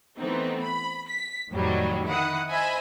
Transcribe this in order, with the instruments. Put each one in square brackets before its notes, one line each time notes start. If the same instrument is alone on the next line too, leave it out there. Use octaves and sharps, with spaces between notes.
[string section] E3 A3 B3 C4 D#4
B5
B6
F2 A2 D#3 F#3 G3
D#3 E4 F#5 D#6
C5 D#5 E5 G#5 B5